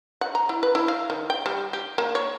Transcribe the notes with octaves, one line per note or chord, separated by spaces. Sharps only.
F#5
A#5
E4
B4
E4
F5
D#3
G5
G3
G4
A#3
C#5